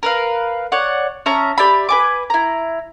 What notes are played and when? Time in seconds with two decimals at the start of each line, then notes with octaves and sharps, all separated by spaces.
0.03 A#4 B4 F5
0.72 C#5 D5 F#5
1.26 C#4 E5 A5 A#5
1.58 G4 D5 E5 B5
1.89 B4 G#5 D6
2.30 E4 A#5